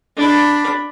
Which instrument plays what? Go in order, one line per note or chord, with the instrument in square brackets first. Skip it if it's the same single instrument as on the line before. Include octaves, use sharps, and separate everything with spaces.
[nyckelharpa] D4 B5